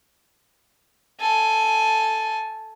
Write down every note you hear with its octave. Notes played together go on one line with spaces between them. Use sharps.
A4 G#5